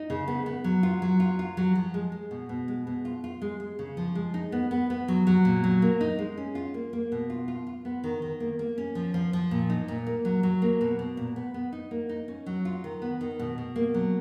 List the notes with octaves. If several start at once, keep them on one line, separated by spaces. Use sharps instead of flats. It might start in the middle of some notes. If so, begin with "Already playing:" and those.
Already playing: D#4
C#3
B3
B3
F#3
F4
F#3
F4
F4
F#3
F3
G#3
G#3
B2
B2
G#3
B2
F4
F4
G#3
G#3
C#3
F3
G#3
D#4
B3
B3
B3
F#3
F#3
A#2
F#3
A#3
D#4
G#3
C#4
F4
A#3
A#3
B2
F4
F4
F4
B3
D#3
D#3
A#3
A#3
C#4
F3
F3
F3
A#2
D#4
A#2
A#3
F#3
F#3
A#3
B2
B2
A#2
B3
B3
D#4
A#3
D#4
C#4
F#3
F4
D#3
B3
D#3
B2
B2
A#3
F#3